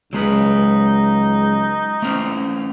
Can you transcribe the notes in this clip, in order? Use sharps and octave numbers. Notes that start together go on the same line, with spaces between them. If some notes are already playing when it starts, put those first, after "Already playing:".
C#2 F#3 G#3 D#4 B4
A3 C4 C#4